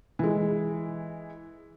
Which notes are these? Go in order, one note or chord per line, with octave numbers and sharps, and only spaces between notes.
E3 G#3